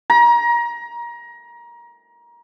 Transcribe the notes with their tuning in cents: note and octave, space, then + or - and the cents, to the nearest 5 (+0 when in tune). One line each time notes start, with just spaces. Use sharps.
A#5 +25